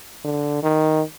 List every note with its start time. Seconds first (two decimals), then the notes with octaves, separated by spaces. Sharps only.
0.25 D3
0.62 D#3